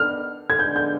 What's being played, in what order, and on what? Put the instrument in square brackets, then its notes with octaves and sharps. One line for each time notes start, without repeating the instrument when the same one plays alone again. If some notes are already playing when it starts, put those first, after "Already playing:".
Already playing: [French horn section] D#3 B3 D4 [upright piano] F6
[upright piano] G#6
[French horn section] G2 D3 G#3 B3 D4 [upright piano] G6
[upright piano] G6